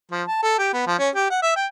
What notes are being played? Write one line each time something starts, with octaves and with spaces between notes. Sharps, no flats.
F3
A5
A4
G4
B3
F3
C#4
G4
F#5
E5
G5